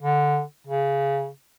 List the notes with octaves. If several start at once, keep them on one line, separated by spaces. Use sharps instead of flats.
D3
C#3